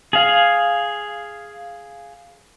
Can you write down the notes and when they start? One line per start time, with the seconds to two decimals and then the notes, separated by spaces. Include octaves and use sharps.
0.13 G#4 F5